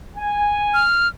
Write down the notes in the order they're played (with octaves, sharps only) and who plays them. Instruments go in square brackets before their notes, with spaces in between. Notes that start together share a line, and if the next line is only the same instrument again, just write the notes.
[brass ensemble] G#5
[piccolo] F6